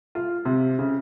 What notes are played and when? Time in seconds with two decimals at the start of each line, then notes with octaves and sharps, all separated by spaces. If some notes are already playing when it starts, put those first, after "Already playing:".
0.15 F4
0.45 C3
0.79 C#3